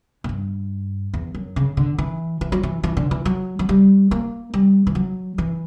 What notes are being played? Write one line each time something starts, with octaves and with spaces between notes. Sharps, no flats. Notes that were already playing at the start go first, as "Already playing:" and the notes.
A#2
G2
E2
F#2
C#3
D3
E3
E3
F#3
E3
E3
D3
E3
F#3
F#3
G3
A#3
G3
E3
F#3
E3